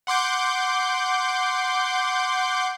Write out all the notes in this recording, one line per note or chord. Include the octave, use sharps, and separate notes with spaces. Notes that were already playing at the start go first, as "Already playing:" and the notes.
F#5 C6 D6 G6